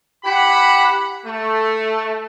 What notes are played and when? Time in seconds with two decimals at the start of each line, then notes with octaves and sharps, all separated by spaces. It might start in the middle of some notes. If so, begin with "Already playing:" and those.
0.24 E4 G4 F#5 B5
1.25 A3